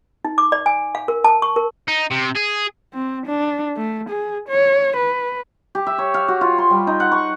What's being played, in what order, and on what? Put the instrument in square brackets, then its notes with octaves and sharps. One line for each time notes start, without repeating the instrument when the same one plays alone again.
[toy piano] D#4
D6
D5
G#5
F5
A#4
A5
C#6
A#4
[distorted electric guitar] D#4
C3
G#4
[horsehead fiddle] C4
D4
A3
G#4
C#5
B4
[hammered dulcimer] G4
E5
C#5
F5
F#4
F4
C6
G3
D#4
F#5
C#6